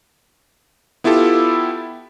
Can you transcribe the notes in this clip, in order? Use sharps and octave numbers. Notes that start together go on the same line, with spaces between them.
B3 E4 F4 G4 A4